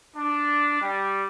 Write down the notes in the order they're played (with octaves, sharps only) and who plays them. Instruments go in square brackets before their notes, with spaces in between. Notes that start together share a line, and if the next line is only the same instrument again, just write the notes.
[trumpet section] D4
G3